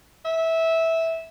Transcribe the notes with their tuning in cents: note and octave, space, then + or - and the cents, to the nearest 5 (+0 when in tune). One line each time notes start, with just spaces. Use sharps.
E5 -15